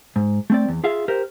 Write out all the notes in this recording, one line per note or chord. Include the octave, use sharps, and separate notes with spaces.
G#2
A3 C4 D5
E2
F4 G#4 E5 F5
G4 A#4 C5